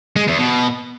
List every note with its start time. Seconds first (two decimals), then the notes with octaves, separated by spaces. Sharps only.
0.16 G#3
0.28 E2
0.39 B2